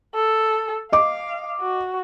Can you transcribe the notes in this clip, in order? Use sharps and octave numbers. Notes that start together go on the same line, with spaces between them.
A4
D#5 F5 D6
F#4